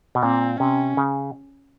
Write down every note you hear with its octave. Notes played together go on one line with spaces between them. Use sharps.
B2
A#2 C4
C3 C#4
C#3